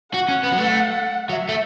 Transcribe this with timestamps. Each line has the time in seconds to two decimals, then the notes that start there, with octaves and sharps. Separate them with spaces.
0.14 F#4 F#5
0.28 C#4
0.43 B3
0.52 F#3
0.58 A3
1.29 F#3 E5
1.49 A3